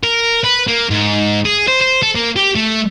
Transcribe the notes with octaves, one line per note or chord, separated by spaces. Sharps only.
A#4
B4
A#3
G#2
G#4
C5
C5
A4
A#3
G4
A3